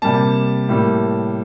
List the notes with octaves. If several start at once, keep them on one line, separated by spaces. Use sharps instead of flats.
C3 G3 A#3 A5
A2 G3 A#3